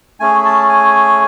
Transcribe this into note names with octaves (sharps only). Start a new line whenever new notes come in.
A3 C#4 G#4 G#5
A5
G#5